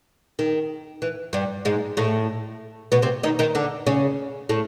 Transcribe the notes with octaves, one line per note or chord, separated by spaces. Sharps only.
D#3
E3
G2 G3
G#2 G#3
A2 A3
B2 B3
C3 C4
D#3 D#4
D#3 D#4
D3 D4
C#3 C#4
A2 A3